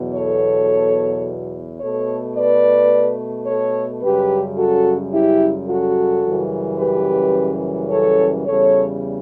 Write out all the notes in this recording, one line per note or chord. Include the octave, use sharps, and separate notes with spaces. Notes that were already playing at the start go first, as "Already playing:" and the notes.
Already playing: E2 B2 F#3
A4 C#5
B2 A3 A4 C#5
B4 D5
A4 C#5
F#2 C#3 G3 G4 B4
F#4 A4
E4 G4
F#4 A4
F#2 C#3 E3 G3
G4 B4
A4 C#5
E2 C#3 G3 A4 C#5